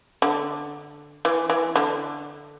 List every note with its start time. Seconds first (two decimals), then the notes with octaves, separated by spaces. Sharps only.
0.22 D3
1.25 E3
1.50 E3
1.76 D3